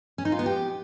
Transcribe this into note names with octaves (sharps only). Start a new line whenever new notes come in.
C#4
D#4
F4
B3
G4